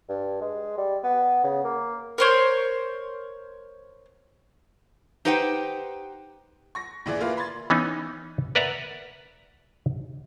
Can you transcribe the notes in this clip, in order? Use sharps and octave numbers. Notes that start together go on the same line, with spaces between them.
G2
G#3
G3
B3
C#3
A#3
A#4 C5 C#5
D#4 G4 B4 C5 F#5 G5
C#6 A#6
A#1 E3 G#4 D5
A#3 E4 F4 B4 F5
B5 C6 G#6 A6
E3 B3 C#4 D#4
A#4 B4 D5 E5 F#5 A#5